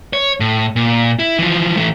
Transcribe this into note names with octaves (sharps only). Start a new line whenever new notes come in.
C#5
A2
A#2
E4
E3 F3
E3 A3